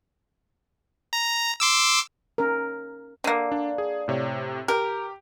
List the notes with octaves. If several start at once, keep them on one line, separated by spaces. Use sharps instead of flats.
A#5
C6 D6 E6
C#4 A#4
D3 A#3
D4
G#4
A2 C3 C#5
G4 A#4